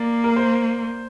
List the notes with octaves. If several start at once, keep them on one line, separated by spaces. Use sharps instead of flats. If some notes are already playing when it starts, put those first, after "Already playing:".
Already playing: A#3 D5
A#4
C5